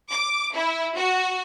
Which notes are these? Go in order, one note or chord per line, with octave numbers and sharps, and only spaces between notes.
D6
E4
F#4